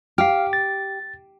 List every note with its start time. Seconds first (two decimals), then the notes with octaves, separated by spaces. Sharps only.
0.18 G4 F5 F6
0.53 A6